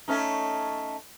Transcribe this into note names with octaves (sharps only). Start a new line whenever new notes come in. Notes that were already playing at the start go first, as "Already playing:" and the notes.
A3 C#4 D#4